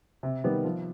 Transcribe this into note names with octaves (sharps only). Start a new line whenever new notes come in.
C3
D#3 G3 B3
F3